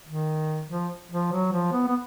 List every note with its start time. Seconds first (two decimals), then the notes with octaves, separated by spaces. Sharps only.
0.07 D#3
0.69 F3
1.12 F3
1.32 F#3
1.53 F3
1.73 B3
1.88 B3